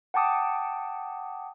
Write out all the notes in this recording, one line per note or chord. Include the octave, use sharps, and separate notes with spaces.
F#5 G5 A5 D6 D#6